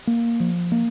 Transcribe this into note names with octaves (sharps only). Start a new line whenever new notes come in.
A#3
F3
A#3